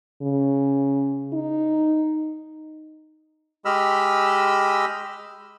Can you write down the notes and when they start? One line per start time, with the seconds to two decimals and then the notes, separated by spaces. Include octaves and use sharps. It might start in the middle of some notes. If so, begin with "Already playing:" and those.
0.22 C#3
1.33 D#4
3.65 G#3 G4 D#5 B5 E6 F6